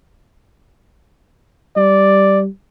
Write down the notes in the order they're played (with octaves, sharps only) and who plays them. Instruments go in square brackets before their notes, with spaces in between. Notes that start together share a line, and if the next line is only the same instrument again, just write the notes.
[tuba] G3 [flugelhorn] D5